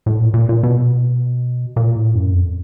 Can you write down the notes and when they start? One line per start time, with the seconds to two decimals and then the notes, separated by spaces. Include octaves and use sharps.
0.06 A2
0.20 A#2
0.34 A#2
0.49 A#2
0.63 B2
1.76 A#2
1.95 A2
2.14 F#2
2.33 F2